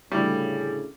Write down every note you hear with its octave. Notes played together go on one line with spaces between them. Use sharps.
D2 A2 C#3 G3 E4